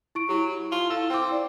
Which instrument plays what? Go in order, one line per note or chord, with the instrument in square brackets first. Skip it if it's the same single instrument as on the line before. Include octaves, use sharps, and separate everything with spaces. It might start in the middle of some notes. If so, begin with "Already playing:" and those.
[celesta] E4 C#6 D7
[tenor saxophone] F#3 [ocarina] E4 [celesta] G4
[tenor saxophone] F4
[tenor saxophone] A4 [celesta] F5
[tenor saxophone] C4 [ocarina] E4 [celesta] G5 D6
[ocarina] D5